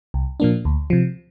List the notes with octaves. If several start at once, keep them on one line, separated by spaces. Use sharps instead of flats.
C2
A#2 F3 A#3 D4
D2
C3 F3